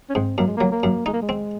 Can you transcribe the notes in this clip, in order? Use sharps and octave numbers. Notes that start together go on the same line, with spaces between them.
C#4
G#2 C4
F#2 A#3
G#3
F#3 A#3
A#3
F#2
G#3 D#4
A#3
G#3
C4